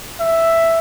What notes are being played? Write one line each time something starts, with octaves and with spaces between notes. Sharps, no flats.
E5